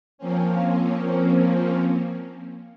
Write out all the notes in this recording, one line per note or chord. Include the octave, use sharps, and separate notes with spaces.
F3 A#3 C4 C#4